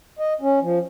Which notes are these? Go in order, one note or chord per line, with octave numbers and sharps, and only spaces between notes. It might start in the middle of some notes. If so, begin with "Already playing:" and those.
D#5
C#4
F3